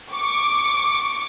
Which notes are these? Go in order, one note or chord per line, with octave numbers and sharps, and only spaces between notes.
C#6 D6